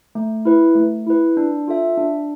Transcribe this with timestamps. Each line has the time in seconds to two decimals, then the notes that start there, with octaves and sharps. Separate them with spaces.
0.15 A3
0.45 E4 B4
0.75 A3
1.07 E4 B4
1.37 D4
1.68 F4 A4 E5
1.97 D4